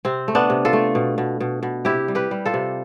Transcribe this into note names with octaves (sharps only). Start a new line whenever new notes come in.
C3 C4
A3
B3 D4
C3
F4 A4
A3
B2
B2
B2
B2
C3 E4 G4
G3
G4 B4
G3
F4 A4
C3